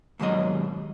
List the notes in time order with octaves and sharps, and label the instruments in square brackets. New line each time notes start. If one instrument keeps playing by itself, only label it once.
[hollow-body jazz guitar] D#2 G#2 B2 F#3 D#5